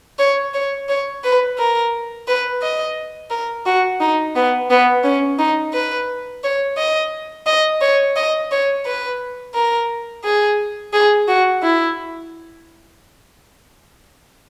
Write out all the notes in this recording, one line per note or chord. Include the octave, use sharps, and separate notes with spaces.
C#5
C#5
C#5
B4
A#4
B4
D#5
A#4
F#4
D#4
B3
B3
C#4
D#4
B4
C#5
D#5
D#5
C#5
D#5
C#5
B4
A#4
G#4
G#4
F#4
E4